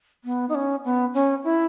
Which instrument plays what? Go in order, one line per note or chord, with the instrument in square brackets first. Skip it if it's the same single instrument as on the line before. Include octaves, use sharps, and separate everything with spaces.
[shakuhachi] B3
D#4
C#4
B3
C#4
E4